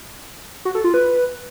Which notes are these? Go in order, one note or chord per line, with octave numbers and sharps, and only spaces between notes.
F#4
A4
F4
B4